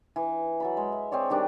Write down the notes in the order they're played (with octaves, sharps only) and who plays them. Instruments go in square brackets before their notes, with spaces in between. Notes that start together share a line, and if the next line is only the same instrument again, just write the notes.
[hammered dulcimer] E3
F#3 A4 B5
G#3
E5
C4 G#4 C#5 D5
D#3 G3 D4